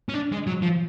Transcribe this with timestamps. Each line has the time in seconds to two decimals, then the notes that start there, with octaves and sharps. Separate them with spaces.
0.09 C#4
0.14 D4
0.32 G#3
0.47 F#3
0.62 F3